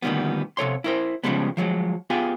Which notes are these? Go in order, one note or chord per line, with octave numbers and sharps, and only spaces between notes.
D2 A#2 D#3 G3 B3
C3 A4 C#5 C6
E4 A#4 C5
C#3 E3 F3 G3 G#3 B3
F3 F#3 G#3
B3 F4 G4 G#4